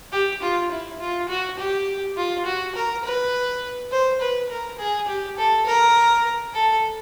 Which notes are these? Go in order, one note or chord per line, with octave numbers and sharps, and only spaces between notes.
G4
F4
E4
F4
F#4
G4
F4
F#4
A#4
B4
C5
B4
A#4
G#4
G4
A4
A#4
A4